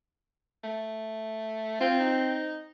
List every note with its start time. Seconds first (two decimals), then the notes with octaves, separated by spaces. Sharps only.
0.64 A3
1.81 C4 F4
2.00 D#4